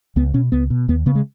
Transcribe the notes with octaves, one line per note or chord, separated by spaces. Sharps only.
C#2 B3
B2 C#4
C#2 B3
B2
D#2 B3
C#3 B3
G#3